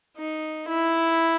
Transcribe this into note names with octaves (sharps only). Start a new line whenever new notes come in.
D#4
E4